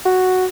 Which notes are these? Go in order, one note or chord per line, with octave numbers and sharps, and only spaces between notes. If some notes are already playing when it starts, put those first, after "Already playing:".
F#4